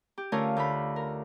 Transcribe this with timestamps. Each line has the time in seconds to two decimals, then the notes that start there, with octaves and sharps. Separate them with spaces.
0.18 G4
0.32 D3 A3 C#4 F4 A#4 C#5
0.56 D2 F4 B5
0.96 A#4